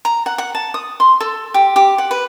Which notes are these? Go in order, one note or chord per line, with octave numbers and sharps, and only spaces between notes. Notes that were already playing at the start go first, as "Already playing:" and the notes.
A#5
F#5
F#5
A5
D#6
C6
A4
G4
G4
F#5
B4